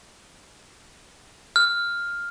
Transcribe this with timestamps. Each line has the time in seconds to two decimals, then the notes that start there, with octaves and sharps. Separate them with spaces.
1.56 F6